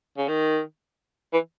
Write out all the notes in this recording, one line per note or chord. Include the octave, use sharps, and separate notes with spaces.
C#3
D#3
E3